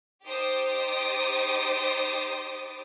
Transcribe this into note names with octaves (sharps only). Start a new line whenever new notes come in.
D#4 G4 C5 D6 D#6 A6